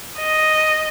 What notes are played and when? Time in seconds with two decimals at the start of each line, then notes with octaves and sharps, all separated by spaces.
0.18 D#5